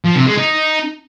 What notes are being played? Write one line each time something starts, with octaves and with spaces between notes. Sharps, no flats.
F3
C3
G#3
D#4